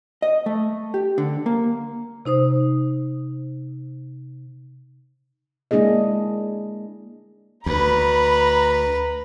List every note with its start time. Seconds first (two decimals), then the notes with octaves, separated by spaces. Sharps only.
0.22 D#5
0.46 A3
0.94 G4
1.18 D3
1.46 A#3
2.25 C3 D#4 C5 D#6
5.71 G#3 A#3 D4 E4 G#4 D#5
7.66 D2 B4 A#5 B5